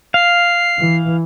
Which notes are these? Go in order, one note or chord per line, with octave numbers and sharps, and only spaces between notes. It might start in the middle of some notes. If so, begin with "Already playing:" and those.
F5 C7
E3